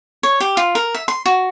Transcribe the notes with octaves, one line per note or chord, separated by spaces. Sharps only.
C#5
G4
F4
A#4
E5
C6
F#4